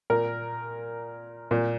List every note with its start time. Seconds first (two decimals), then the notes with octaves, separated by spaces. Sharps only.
0.10 A#2 A#4
1.51 A#2